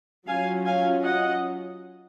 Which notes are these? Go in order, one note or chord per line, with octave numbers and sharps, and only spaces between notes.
F#3 C#4 F4 F5 G#5
F5 G#5
D#5 F#5